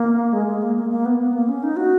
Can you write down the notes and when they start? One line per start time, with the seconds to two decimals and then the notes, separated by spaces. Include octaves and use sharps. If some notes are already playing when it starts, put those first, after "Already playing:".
Already playing: A#3
0.33 G#3
0.47 G#3
0.62 A#3
0.76 A#3
0.90 A#3
1.05 B3
1.20 B3
1.34 A#3
1.49 C#4
1.63 D#4
1.77 F#4